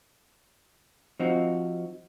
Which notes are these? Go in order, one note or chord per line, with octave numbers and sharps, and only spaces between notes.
F3 C4 D#4 F#4